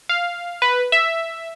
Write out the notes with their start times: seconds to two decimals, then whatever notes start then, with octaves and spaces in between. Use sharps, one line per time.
0.09 F5
0.62 B4
0.92 E5